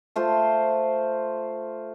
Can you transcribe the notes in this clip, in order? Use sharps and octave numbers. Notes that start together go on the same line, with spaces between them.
A3 F4 C5